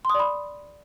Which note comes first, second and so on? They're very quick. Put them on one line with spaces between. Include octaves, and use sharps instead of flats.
C6 D#6 D5 B5